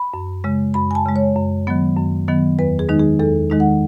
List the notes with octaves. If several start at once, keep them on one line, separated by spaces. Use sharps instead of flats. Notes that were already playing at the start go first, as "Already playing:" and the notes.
Already playing: B5
F#2
C#3 G#3
F#2 B5
G#5
A5
C#3 G#3
C#5
F#2
D#3 F#3 B3
F#2
D#3 F#3 B3
E2 B4
G#4
D#3 G#3 D#4
G#4
E2 A4
D#3 G#3 D#4
F#5